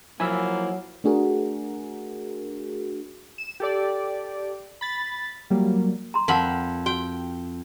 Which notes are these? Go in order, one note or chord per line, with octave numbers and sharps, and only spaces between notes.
F3 F#3 A#3 E4 G#5 B5 E6
A3 D4 F#4 G#4 A#4
E7
G4 A4 D5
B5 A6
F#3 G3 A#3
A#5 C6
F2 A#4 F#5 B5
F#4 G5